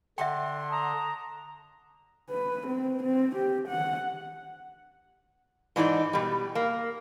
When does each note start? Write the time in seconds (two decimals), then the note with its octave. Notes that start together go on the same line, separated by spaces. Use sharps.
0.18 D3 E5 F#5 G5 C6
0.70 A5 A#5 D#6
2.30 B4
2.67 C4
3.03 C4
3.35 G4
3.68 F#5
5.76 G#2 E3 D4 D#4 D5
6.13 B2 G3
6.55 A#3